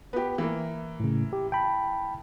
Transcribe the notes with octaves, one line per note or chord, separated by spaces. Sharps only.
B3 G4
E3 A#3
A2 C#3
G4
G5 A5 B5